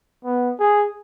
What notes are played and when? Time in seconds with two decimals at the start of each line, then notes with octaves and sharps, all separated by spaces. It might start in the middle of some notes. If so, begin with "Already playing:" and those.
0.25 B3
0.60 G#4